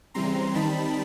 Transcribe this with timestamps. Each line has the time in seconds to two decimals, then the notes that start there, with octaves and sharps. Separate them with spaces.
0.14 C#3 E3 G3 C4 A#5 C6
0.55 D#3 G3 C4 D#4 A5 B5